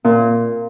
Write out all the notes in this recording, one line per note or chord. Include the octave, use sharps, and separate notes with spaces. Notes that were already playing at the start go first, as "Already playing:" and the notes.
A#2